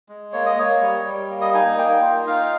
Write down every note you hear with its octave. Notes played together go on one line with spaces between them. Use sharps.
G#3
A#3 C#5
D#5
A#3 C#5
G3
G3
A#3
D#5
D#4 G#5
A#3 G5
F4
D#4 F5